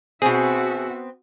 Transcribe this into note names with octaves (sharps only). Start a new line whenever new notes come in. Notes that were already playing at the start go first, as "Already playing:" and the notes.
B2 B3 C4 F#4 G#4 E5 G#5